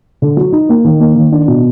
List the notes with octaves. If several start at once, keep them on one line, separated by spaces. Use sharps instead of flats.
D3
F#3
D#4
A#3
D#3
A#3
D#3
D4
B2